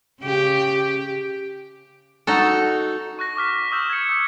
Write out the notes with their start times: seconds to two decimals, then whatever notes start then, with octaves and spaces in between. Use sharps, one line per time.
0.21 C#3 G4
2.27 D#4 F#4 A4
3.19 C#6 F#6 A#6
3.36 C#6 D6 F6 B6
3.71 C#6 D#6 E6 G6 E7
3.90 G#6 C#7
4.09 D#6 G6